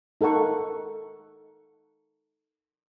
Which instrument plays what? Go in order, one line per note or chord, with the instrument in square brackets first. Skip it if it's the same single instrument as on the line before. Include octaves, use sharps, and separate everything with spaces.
[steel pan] D#4 A4 A#4 F#5 C#6